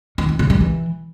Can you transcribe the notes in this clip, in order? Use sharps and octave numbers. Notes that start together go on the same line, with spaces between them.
D#3
F2
C#3
G3
E3